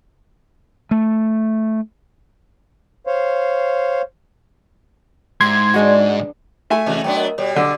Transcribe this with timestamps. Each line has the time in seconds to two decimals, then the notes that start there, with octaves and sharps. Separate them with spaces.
0.91 A3
3.07 C5 C#5 F5
5.41 G#2 E4 G4 C6 G#6
5.74 G#3 D4 F#4 G#4 B4
6.70 A3 E5 G#5
6.86 C3 E3 F#4 D#5 F7
7.04 F#3 B3 D4 G5 C6
7.16 A#4 D#5
7.38 B2 G3 C#5
7.56 D3 D6 E6 D#7